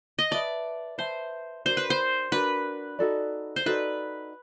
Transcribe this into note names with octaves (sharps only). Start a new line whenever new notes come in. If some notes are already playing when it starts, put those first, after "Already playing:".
D#5
B4 D5 E5 A5
B4 C5 E5 A5
D4 F#4 A#4 C5
B4
C5
D4 F#4 A#4 B4
D#4 F#4 A4 D5
C5
D#4 F#4 A4 B4 D5